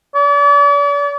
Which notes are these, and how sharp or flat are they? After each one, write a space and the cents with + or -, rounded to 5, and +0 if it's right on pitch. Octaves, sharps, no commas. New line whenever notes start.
D5 -40